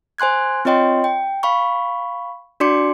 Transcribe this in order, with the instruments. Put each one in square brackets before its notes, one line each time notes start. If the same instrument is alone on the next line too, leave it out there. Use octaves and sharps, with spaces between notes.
[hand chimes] C5 G#5 C6 F#6 G#6
C4 F4 C#5 D#5 G5 C6
G5
F5 B5 C#6
D4 F#4 D5 C6 D6 C#7